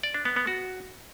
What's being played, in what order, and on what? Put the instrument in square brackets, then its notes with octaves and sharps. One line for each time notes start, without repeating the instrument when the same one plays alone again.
[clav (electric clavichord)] D5
D4
B3
B3
F#4